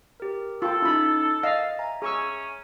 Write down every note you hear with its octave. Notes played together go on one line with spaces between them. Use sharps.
G4 A#4
F4 A4 G5
C#4 D#4 E4 B5
D#5 F5 E6 A6
E5 G#5 A#5
C#4 G#4 C#6 E6